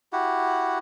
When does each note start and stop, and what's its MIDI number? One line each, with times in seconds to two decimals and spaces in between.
0.13 0.79 64
0.13 0.79 66
0.13 0.79 67
0.13 0.79 78